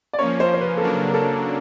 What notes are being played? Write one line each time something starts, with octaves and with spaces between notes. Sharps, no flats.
D5
F3 A#3 C#4 C#5
C5
C5
B4
A4
C#3 F#3 A#3 D4 A#4
A#4
A4